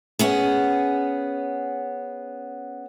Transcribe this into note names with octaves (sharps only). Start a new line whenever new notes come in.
B3 C#4 G#4